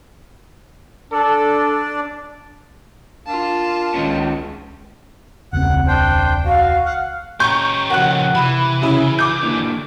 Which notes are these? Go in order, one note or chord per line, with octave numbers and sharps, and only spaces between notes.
D4 A4 D5
D4 F4 A#4 F5 A5
C#2 D#3 G#3 C#4
E1 C#2 C4 F#5
D4 C5 G5
F#4 F5
F5 F#5
C#4 G4 G#5 A#5 C#6 G6
C#3 F3 A#4 F#5 F#6
C3 E3 B5
C#3 E4
D6 G6
D3 A#3 D4